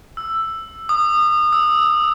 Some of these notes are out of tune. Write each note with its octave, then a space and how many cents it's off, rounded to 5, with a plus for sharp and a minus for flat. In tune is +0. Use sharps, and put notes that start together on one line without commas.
E6 +5
D#6 -30
E6 -30